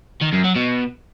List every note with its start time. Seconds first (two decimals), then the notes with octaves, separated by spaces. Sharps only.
0.21 D#3
0.33 F#2
0.44 F#3
0.55 B2